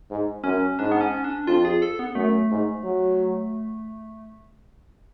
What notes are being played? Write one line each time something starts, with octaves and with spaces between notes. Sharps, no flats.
G#2
F#2 C#4
G#2 D4
B3
C#4
D4
F2 F4
G#4
A4
B3
F#2 A3
G#2
F#3